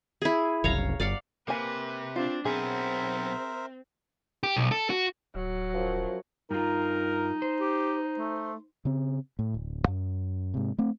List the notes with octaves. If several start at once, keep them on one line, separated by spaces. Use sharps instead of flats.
E4 G#4
F#1 C2 C#5 F5 A#5
G1 D5 F5 F#5
C3 A#3 B4 G#5
C4 D4 F4
B1 B3 C4 G#4 A#4 C5 E5
G4
B1
A4
F#4
D1 F#3
F#2 F3
G2 D#4 F4 A#4
C5
G4
A3
C#3 C4
A2
D1
F#2
G#2 C3
A3 C4